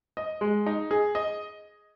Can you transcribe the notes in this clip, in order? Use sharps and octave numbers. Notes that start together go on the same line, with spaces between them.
D#5
G#3
D#4
G#4
D#5